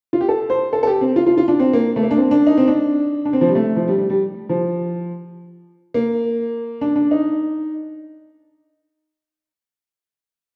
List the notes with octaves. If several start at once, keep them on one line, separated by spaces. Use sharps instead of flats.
F4
G4
A4
C5
A4
A4
G4
C4
F4
F4
F4
D4
C4
A#3
A3
A#3
D4
C4
D4
D#4
C4
D4
D4
C4
F3
G3
A3
F3
G3
G3
G3
F3
A#3
D4
D4
D#4